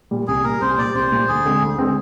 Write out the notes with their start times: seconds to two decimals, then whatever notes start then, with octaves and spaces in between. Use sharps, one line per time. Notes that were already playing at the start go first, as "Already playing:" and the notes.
0.11 A#2 G3
0.27 C2 G#4
0.44 A#2 G3 A#4
0.61 C2 C5
0.78 A#2 G3 D5
0.95 C2 C5
1.12 A#2 G3
1.28 D2 G#4
1.45 D3 G#3 C4
1.62 D2
1.79 D3 G#3 C4